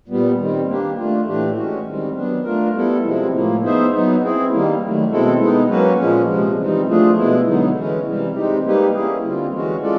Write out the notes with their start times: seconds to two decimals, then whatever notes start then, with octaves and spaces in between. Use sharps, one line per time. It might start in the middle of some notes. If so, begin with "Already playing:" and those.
0.08 A#2 G3 B3
0.38 D#3 G3 C4
0.68 A#3 D4 G4
0.97 A3 D4 F4
1.26 A2 E3 A3 D4 G4
1.56 G#3 C#4 F#4
1.86 D#3 G3 C4
2.15 F#3 B3 D4
2.44 A3 D4 F4 A#4
2.74 G3 B3 E4 A4
3.04 C3 F3 G#3 C4 E4
3.33 A2 F3 A#3
3.62 B3 D#4 G#4 C5 E5
3.92 F#3 B3 D#4
4.21 C4 E4 G#4
4.51 D#3 G3 A#3
4.80 D#3 F#3 A3
5.10 B2 G#3 C4 E4 A4
5.39 G#3 B3 D#4
5.69 F#3 A#3 C#4 F#4 B4
5.98 A#2 F3 G#3 C#4
6.28 C3 F3 G#3
6.57 E3 G3 C4 D#4
6.87 F3 A3 D4 F4 G#4
7.17 B2 G#3 B3 E4
7.46 D3 F#3 B3 D#4
7.76 E3 G#3 C#4
8.06 C3 E3 G3
8.34 G#3 C4 D#4 G4
8.64 G3 A#3 D#4 G4 B4
8.93 A#3 C#4 E4 G#4
9.23 D3 G3 C4 F4
9.52 E3 G#3 C#4 F#4
9.82 G#3 C#4 F4 A4 D5